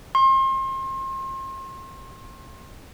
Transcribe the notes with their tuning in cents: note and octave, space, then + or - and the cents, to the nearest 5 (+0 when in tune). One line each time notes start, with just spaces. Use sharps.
C6 +35